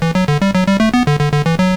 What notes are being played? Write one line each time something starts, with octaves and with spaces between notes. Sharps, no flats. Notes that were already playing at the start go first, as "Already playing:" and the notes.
E3
F#3
D3
G3
F#3
G3
A3
B3
D3
D3
D3
E3
F#3